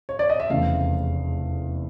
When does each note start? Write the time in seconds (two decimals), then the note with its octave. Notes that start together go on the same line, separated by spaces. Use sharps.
0.09 C#5
0.19 D5
0.30 D#5
0.40 E5
0.50 F1 E2 C#3 E3 A3 F5